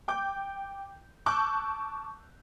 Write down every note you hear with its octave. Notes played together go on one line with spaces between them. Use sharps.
G5 D6 G6
A5 C#6 D6 E6 F#6 G6